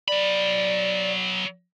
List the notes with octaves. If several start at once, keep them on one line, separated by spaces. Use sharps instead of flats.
F#3 D5 B5